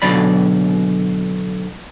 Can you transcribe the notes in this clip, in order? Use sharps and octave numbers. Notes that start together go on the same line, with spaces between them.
D2 B2 D3 F#3 D5 B5